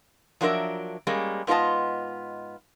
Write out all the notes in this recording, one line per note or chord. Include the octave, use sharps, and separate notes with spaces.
F3 F#3 D4 A#4 E5
G3 G#3 A#3 C#4
G#2 B3 F4 A4 D#5 A5